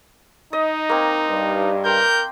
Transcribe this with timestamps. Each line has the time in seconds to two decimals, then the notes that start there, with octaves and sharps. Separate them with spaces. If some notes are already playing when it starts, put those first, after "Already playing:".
0.53 D#4 D#5
0.89 A#3 C4
1.29 G2
1.85 A#4 G5 C6 G6